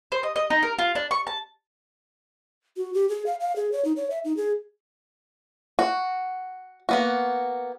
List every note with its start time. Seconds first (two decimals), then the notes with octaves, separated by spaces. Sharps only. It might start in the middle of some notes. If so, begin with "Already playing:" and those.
0.12 C5
0.23 D#5
0.36 D#5
0.50 D#4
0.63 A#4
0.78 F4
0.95 D4
1.11 C#6
1.27 A5
2.77 F#4
2.94 G4
3.09 G#4
3.26 F5
3.40 F5
3.56 G#4
3.72 C#5
3.85 D#4
3.96 C#5
4.10 E5
4.24 D#4
4.37 G#4
5.79 F#4
6.89 A#3 B3 F#4